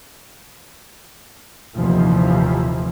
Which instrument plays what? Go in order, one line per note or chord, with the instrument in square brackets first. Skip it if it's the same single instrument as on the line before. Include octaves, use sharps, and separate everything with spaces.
[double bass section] F1 D#2 A#2 E3 F3